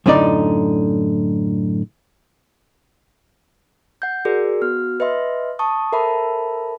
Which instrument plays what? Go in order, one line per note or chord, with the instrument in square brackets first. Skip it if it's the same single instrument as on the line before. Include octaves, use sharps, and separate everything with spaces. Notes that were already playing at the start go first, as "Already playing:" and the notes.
[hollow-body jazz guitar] F#2 A2 D3 D#4 D5
[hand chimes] F#5 G6
F#4 G#4 A#4 D5
B3 F#4 F6
B4 D#5 E5 C6
A5 C#6 D#6
A4 A#4 C5 E5 A5 B5